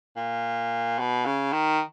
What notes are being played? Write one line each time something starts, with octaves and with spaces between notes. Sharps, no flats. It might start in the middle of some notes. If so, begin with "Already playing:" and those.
A#2
B2
C#3
D#3